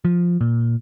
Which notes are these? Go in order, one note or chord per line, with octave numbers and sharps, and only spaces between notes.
F3
A#2